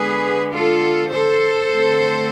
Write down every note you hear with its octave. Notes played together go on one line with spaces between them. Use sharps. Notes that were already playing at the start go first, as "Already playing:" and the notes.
Already playing: D3 G#3 B3 G#4 B4
F4 A4
A4 C5
D3 A3 C4